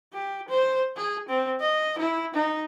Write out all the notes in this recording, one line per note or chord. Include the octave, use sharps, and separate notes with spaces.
G4
C5
G#4
C4
D#5
E4
D#4